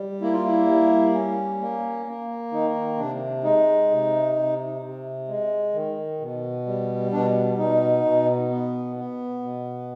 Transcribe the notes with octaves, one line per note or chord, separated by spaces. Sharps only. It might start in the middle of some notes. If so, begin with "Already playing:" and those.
Already playing: G3
A#3 E4
F4
E4
G3
C#4
A#3
A#3
D#3 D#4
C3 D4
G#3 D#4
C3
C3
C3
G#3
D#3
B2
G3
B2 D4
B2 D#4
B2
B3
B3
B2